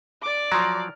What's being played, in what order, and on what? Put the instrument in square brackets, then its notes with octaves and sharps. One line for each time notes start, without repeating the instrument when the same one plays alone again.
[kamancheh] D5 D6
[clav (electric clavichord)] F3 F#3 [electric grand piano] A#5 C6 F6